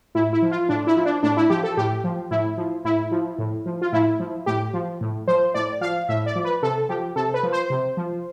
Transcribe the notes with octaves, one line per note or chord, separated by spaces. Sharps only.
A2 E4
E4
F3
F4
A2 D4
E4
F3
D4
A2 D4
E4
F3 G4
A4
A2 G4
F3
A2 E4
F3
A2 E4
F3
A2
F3
F4
A2 E4
F3
A2 G4
F3
A2
F3 C5
A2 D5
F3 F5
A2 E5
D5
F3
B4
C3 A4
F3 G4
C3 A4
B4
F3
C5
C3
F3